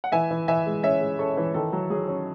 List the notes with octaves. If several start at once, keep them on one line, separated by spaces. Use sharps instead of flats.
F#5
E3 E5 G#5
E3
E3 E5 G#5
G#3
C#4 C#5 E5
G#3
C#4 A4 C#5
E3
D#3 A4
F#3
F#3 G#4
C#4